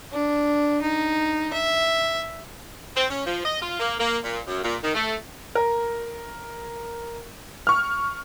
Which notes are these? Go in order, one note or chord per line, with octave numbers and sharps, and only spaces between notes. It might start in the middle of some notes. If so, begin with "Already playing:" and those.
D4
D#4
E5
C4
C#4
F3
D#5
F4
A#3
A#3
A#2
F#2
A#2
D#3
A3
A#4
C#6 F6